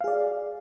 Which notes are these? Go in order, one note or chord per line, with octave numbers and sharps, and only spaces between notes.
G#4 D5 F5